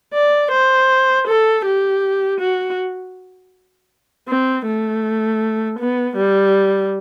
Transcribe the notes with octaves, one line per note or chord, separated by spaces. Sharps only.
D5
C5
A4
G4
F#4
C4
A3
B3
G3